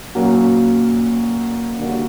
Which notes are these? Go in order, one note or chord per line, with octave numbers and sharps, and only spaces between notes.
A#2 F#3 A#3 C#4 F#4
D3 G3 A#3 D4 F#4